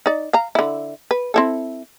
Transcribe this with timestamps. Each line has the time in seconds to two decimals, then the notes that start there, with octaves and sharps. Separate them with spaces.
0.06 D#4 D5
0.33 F5 A#5
0.55 D3 E4
1.11 B4
1.34 C4 E4 A4